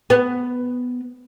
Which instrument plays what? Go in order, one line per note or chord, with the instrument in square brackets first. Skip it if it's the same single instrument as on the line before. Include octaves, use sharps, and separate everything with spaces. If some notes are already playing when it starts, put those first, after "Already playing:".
[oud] B3